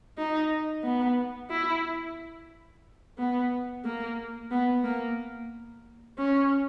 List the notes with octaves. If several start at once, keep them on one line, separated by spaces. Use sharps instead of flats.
D#4
B3
E4
B3
A#3
B3
A#3
C#4